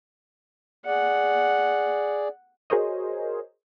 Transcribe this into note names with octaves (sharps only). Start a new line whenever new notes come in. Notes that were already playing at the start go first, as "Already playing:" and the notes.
G#4 D5 F#5
F#4 G#4 A#4 C5 C#5 D#5